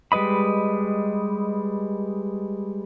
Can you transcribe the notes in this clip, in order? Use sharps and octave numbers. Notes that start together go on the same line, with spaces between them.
G3 G#3 B4 D#5 B5